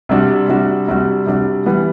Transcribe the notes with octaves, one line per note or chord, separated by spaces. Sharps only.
C3 G3 D4 F#4
C3 G3 D4 F#4
C3 G3 D4 F#4
C3 G3 D4 F#4
E3 G3 B3